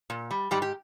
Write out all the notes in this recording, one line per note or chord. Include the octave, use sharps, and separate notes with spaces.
A#2
G3
G#2 G3 G4
G4